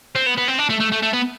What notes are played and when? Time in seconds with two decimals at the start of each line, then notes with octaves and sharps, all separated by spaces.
0.16 C4
0.27 B3
0.37 B3
0.48 C4
0.59 D4
0.70 A3
0.80 A3
0.92 A3
1.03 A3
1.13 B3